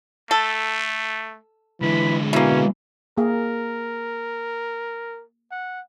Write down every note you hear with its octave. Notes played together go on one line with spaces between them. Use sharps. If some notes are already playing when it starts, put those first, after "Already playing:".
A3 A4
D3 E3 G#3 B5
B2 E3 A#3 C#4
A#3 G#4 A#4
F#5